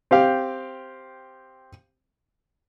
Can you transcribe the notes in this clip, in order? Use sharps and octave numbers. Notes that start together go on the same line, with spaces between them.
C4 G4 F5